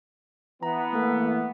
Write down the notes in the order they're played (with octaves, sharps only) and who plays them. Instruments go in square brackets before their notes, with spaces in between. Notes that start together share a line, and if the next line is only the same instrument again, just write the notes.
[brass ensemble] E3 B3 [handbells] A#5
[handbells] A3 A#3 A4